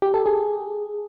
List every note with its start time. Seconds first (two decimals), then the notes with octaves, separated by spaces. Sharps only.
0.02 G4
0.14 A4
0.26 G#4